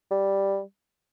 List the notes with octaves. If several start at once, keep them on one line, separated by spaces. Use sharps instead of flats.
G3